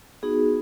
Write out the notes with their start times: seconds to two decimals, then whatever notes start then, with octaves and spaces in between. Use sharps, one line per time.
0.23 B3 D#4 F#4 G#4